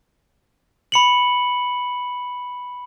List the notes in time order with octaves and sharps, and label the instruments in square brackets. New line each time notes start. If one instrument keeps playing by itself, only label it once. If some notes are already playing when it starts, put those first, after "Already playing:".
[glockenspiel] B5 C#7 F#7